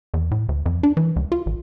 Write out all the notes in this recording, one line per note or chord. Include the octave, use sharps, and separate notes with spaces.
E2
A2
D2
F2
D4
E3
C#2
F4
A1